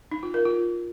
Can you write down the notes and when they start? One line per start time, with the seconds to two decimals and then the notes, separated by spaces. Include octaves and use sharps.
0.12 D#4
0.23 F4
0.34 A#4
0.45 F4